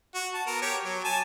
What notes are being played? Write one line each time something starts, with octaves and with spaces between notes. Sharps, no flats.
F#4
A5
B3 A#4
G4 C#5
F#3
G#5 A5